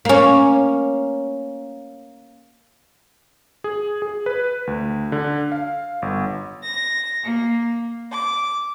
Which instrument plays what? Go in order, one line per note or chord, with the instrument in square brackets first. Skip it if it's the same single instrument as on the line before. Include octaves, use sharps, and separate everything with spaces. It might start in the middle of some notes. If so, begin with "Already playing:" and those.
[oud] A#3 C#4
[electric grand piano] G#4
G#4
B4
D2
D3
F5
G1
[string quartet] A#6
A#3
D6